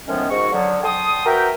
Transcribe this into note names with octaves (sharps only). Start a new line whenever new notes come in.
A2 D#3 F3 G#3 B3 C#4
G#2 F#4 C#6
D3 F3 F#3
G5 A5 C6 D#6
F#4 A#4 B4 E5 G5